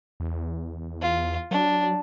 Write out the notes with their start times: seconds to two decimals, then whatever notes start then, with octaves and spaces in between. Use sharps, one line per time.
0.20 E2
1.02 F4
1.51 F#3 D4